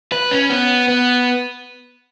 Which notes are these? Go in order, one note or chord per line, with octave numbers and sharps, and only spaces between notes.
B4
C#4
B3
B3